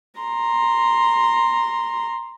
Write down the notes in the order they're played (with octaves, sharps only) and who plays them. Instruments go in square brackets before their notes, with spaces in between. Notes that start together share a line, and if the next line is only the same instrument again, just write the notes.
[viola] A#5 C6